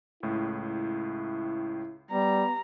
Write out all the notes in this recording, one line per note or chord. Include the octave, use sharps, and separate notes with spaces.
C#2 A2 E4
G3 B3 A#5